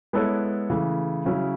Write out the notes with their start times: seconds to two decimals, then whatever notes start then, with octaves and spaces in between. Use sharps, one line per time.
0.13 G#3 B3 E4 A4 C#5
0.70 C#3 E3 A3
1.25 C#3 F#3 C#4 E4